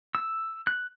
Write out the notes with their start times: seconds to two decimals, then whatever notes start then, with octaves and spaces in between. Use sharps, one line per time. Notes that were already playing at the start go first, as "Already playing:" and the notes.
0.15 E6
0.67 F#6